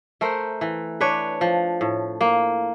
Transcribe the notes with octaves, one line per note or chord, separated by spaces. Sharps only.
A3 A#4 C5
E3
D4 B4 C#5
F3
A2
A#3